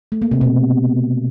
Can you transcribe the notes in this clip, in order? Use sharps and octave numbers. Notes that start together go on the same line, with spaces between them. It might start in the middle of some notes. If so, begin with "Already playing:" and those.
A3
A#3
C3
B2